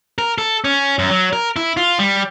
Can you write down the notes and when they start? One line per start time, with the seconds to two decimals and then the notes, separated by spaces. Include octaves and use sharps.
0.18 A#4
0.38 A4
0.64 C#4
0.99 F#2
1.10 F#3
1.33 A#4
1.56 E4
1.77 F4
1.99 G3